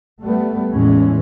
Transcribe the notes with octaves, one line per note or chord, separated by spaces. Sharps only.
G3 A3 B3
E2 A2 E3 G#3 C#4